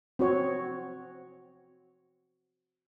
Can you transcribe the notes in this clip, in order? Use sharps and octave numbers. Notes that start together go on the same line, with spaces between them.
C4 F#4 C#5